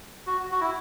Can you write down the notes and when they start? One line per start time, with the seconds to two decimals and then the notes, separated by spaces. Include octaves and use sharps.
0.27 F#4
0.52 F#4
0.61 E4